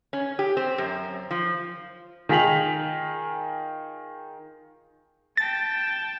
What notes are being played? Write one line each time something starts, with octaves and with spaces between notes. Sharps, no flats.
C#4
G4
C4
F#2
F3
D#3 F4 G#4 B6 F7 F#7
G5 A5 A6